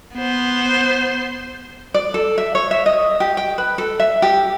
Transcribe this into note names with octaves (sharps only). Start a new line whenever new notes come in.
B3 C5
D5
A4
E5
C#5
E5
D#5
G4
G5
B4
A4
E5
G4